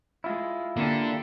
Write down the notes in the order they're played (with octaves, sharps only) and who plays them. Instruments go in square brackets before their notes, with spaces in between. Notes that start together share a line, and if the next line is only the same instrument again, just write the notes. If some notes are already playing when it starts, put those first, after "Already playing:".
[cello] G#3 [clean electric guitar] E4 F4
[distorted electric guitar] D3 [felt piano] A#3 [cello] G4 A4